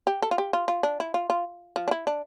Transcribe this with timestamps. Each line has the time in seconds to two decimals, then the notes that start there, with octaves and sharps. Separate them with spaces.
0.07 G4
0.22 A4
0.31 F4
0.38 G4
0.53 F4
0.68 F4
0.83 D4
1.00 E4
1.14 F4
1.30 F4
1.76 F3
1.88 D4
1.91 E4
2.07 D4